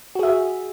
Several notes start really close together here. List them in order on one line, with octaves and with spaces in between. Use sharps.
F#4 G#4 E5